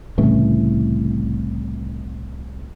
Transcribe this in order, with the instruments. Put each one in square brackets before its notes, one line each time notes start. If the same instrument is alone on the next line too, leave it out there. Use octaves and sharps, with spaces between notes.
[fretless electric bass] C2 A2 C#3 E3